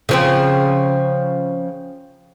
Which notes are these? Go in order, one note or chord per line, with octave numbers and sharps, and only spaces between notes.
C#3 F3 C4